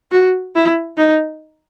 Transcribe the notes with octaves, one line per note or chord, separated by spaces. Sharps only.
F#4
E4
D#4